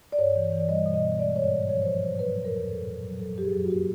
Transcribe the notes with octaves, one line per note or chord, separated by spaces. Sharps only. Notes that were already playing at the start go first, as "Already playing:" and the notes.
D5
G2 C#5
E3
E3
D5
G3 D#5
B2
D#5
B3
G#3 D5
G#2 C#5
D5
G#2
F3 C#5
C5
F3 C#5
A2 C5
F#3 B4
F2
A#4
F2
A#2 A4
A#2
F#3
F#3 A4
F#2 G4
G#4
F#3
F#4
A#3 G4